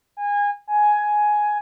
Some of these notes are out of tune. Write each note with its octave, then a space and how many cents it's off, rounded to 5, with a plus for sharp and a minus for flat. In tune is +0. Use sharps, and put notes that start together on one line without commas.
G#5 -25
G#5 +10